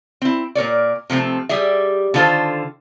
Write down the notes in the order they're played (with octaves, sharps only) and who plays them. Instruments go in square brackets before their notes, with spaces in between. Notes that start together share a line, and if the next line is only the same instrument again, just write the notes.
[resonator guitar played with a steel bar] C4 E4
A#2 A#4 C#5 D5
C3 F3 A3 C4
G3 G4 G#4 E5
D3 D#3 F4 A4 C5